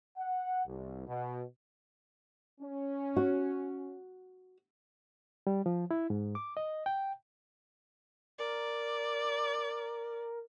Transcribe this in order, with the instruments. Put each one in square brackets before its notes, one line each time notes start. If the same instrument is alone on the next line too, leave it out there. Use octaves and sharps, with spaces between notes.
[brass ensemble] F#5
C2
B2
C#4
[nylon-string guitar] F#4
[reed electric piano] G3
F3
E4
G#2
D6
D#5
G5
[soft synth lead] A#4 [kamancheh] D5